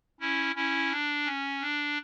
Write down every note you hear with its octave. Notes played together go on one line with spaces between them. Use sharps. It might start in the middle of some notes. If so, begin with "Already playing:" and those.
C#4 E4
C#4 E4
D4
C#4
D4